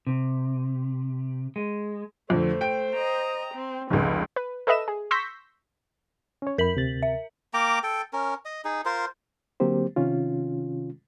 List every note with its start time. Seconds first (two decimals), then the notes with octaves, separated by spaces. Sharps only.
0.07 C3
1.56 G#3
2.30 F2 D3 A3 C5
2.61 G5 D7
2.94 D#5 A#5
3.54 C4
3.90 F1 C#2 G#4
4.36 B4
4.67 A4 B4 D#5 E5 E7
4.88 G#4
5.11 C6 C#6 E6 G6 A#6 B6
6.42 C#4 C#5
6.58 F2 A#4 B5 B6 F#7
6.75 D2 C3 A6
7.03 E5
7.54 A#3 G5 A#5 D6
7.83 A4 G5
8.13 C#4 A#4
8.45 D#5
8.65 D#4 G#4
8.85 F4 A#4 C5
9.60 D3 F#3 A#3 C4 G4 C5
9.96 C3 D#3 C#4 F4